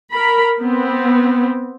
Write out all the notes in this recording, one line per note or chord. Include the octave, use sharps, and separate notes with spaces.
A#4 B5
B3 C4